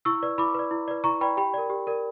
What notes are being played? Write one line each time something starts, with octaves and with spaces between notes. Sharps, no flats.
E4 C#6 E6
B4 D5
E4 B5 D6
B4 D5
E4
B4 D5
E4 A#5 C#6
B4 D5 G5 B5
G4 G5 B5
A#4 D5
G4
A#4 D5